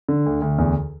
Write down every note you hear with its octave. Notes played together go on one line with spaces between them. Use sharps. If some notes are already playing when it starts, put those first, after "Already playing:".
D3
D2
D2
E2